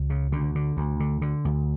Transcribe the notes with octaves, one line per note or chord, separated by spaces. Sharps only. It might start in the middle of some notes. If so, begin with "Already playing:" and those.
Already playing: C#2
C#3
D2 D3
D3
D2
D3
D3
D2